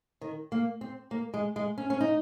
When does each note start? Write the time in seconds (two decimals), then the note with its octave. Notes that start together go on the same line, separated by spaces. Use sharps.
0.21 D#3
0.52 A#3
0.81 C4
1.11 A#3
1.34 G#3
1.56 G#3
1.78 C#4
1.90 C#4
2.01 D#4